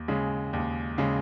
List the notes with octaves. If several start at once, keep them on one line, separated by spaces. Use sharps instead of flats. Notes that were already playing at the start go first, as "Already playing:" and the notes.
Already playing: D#2
C#3 G#3
D#2
C#3 G#3